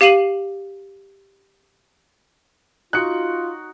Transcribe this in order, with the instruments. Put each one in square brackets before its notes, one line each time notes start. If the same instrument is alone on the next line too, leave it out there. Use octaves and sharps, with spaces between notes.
[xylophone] G4 F5 C7 D#7 F#7
[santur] D#4 F#4 C#6 [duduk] F4 [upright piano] F#6 C#7